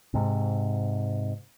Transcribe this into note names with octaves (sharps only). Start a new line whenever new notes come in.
G#2 C3